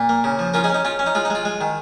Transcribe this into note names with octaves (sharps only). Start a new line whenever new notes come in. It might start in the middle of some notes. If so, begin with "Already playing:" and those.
Already playing: A#2
A#3
C#3
F3
C#4 F4 A#4
D#4 G#4
C#4
D#4
C#4 F4
C#4
D#4
G#3 F4
D#4
G#3 F4
G#3
D#3